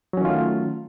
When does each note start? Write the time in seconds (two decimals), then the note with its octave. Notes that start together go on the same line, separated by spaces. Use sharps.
0.13 F#3
0.17 C#4
0.21 D#3
0.25 F4
0.29 A3